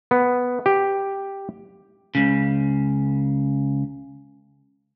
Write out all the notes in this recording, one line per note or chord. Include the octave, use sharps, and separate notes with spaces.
B3
G4
C#2 C#3